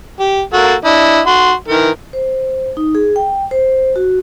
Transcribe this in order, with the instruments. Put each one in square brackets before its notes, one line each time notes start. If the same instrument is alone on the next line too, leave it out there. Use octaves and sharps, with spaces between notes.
[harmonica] G4
A#3 F#4 A4
D4 E4 D#5
F#4 C6
D#3 E3 A#4
[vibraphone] C5
D#4
G#4
G5
C5
F#4